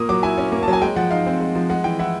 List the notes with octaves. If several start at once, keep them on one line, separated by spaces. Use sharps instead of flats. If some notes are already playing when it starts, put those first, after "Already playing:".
Already playing: A#2 A#3 D#6
F#3 D6
E4 G#5
C#4
A#3
A5
F#3
G#5
G#3 G5
F3 F#5
D#4 F5
C4
G#3
F3
G#3 F#5
E3 G5
E4 F#5